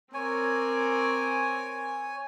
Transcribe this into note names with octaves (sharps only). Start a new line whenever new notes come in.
C4 A#4 C#5 G#5 D6